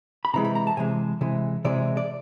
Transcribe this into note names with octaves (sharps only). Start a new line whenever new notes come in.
B5
C3 E3 G#3 A#5
B5
A#5
A5
C3 E3 G#3 G#5
C3 E3 G#3
C3 E3 G#3 D5
D5